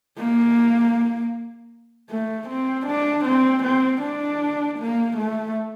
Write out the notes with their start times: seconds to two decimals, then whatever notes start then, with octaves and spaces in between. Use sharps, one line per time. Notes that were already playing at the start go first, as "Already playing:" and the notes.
0.18 A#3
2.10 A3
2.48 C4
2.87 D4
3.25 C4
3.64 C4
4.02 D4
4.79 A#3
5.17 A3